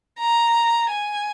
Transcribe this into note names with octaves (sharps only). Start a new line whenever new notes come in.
A#5
G#5